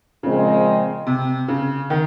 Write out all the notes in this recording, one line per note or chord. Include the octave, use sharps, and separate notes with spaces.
A#2 C#3 F3 G#3 C4
C3
C#3
D#3